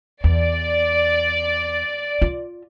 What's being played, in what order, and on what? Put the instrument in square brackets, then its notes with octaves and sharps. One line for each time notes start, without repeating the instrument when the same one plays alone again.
[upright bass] E2 [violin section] D5
[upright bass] F4